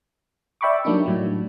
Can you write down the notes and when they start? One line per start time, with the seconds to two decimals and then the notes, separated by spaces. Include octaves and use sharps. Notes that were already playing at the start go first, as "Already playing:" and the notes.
0.61 D5 E5 G5 B5 C#6 D6
0.85 F#3 G3 A#3 D4 D#4
1.06 A2 F#3